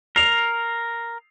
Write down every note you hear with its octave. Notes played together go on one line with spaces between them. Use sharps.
A#4 C7 F7